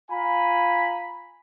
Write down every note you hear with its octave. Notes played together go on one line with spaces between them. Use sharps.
F4 G#5 A#5 B5